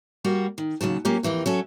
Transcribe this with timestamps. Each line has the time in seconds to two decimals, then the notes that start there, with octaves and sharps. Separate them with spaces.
0.25 G3 A#3 F#4
0.58 D#3
0.81 D#2 C#3 F#3 A5
1.05 F#3 A#3 C#4 F4 G4
1.23 F2 E3 A#3 G4
1.46 F#3 C#4 A4